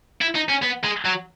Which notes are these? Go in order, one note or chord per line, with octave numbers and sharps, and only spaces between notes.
E4
D#4
C#4
B3
G#3
F#3